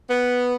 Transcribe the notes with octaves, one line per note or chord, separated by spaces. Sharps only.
B3